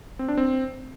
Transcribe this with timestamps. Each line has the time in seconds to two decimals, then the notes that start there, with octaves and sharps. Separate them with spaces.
0.19 C4
0.28 D4
0.37 C4